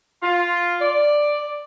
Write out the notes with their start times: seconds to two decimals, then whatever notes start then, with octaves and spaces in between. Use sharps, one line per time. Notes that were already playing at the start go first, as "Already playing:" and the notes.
0.23 F4
0.81 D5